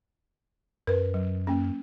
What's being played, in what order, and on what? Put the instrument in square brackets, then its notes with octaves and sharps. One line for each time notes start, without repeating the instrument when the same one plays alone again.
[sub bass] F#2 [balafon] A#4 B4
[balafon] F#3
A#3 C#4